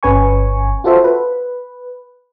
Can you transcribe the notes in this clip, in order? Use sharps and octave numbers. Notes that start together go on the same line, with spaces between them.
G1 C#4 B4 G#5 C#6
F4 F#4 A4 C5 E5
B4